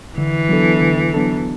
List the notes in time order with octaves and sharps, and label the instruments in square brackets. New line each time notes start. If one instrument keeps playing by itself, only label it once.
[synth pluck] D3 [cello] E3
[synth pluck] F#3 B3 D4 A4
D3
F#3 B3 D4 A4